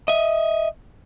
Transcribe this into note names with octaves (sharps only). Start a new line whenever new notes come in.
D#5 E5